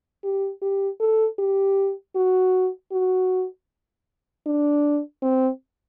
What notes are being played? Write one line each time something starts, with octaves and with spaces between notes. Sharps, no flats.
G4
G4
A4
G4
F#4
F#4
D4
C4